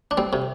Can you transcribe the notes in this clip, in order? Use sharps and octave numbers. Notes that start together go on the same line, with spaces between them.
D4
G3 C4
C3